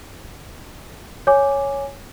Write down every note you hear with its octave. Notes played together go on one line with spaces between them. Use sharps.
C#5 G#5 D6